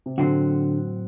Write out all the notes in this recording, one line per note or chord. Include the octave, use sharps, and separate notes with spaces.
C3
A2 D3 F#3 C4 F#4